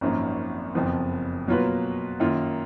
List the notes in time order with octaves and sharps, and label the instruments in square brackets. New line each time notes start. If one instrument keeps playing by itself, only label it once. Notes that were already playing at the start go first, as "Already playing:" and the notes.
[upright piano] G#1 F#2 F3 A#3 D#4
F#1 F2 F3 B3
B2 F#3 A#3 F4 B4
F#2 D#3 A#3 F4